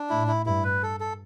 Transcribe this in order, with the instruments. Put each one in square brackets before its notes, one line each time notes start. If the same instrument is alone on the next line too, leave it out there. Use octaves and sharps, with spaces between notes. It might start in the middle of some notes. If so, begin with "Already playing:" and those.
Already playing: [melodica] D4
[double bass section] A2 [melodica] E4
[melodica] E4
[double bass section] G2 [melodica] E4
[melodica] B4
A4
A4